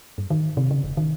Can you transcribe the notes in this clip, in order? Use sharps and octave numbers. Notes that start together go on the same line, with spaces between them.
G2
D#3
C3
C#3
D#1
D#3